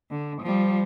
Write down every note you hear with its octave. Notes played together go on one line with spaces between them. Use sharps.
D3
F3 G3